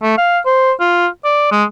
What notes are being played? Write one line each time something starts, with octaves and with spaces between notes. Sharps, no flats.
A3
F5
C5
F4
D5
G#3